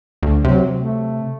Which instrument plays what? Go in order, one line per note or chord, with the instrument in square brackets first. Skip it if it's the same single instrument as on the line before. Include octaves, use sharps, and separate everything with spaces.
[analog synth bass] D2
[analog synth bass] C3 [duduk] F#3
[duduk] A3